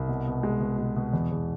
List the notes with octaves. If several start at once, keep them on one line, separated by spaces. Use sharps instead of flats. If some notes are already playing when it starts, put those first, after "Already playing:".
Already playing: C2
B2
B2
G#3
B2
B2
B2
E2
E2